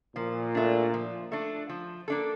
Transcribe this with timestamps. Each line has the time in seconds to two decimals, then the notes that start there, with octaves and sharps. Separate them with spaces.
0.16 A#2 F3
0.55 A3 D4
0.94 F3
1.32 A3 D4
1.69 F3
2.08 A#3 D4 A4